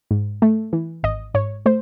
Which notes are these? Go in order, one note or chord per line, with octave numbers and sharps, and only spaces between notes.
G#2
A3
E3
G#1 D#5
G#2 C#5
A3 C5